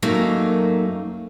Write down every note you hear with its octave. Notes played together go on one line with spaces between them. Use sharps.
F#2 F#3 A3 A#3 D#4